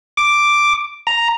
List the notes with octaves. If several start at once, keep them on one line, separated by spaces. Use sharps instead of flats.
D6
A#5